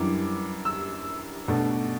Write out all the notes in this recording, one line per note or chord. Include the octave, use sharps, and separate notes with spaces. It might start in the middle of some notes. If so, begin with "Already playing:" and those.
Already playing: F#2 E3 G3 D4 D6
E6
B2 A3 D4